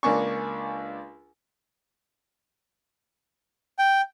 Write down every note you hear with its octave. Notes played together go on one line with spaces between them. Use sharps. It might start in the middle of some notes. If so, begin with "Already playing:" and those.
C#2 A#3 D4 G#5 C#6
G5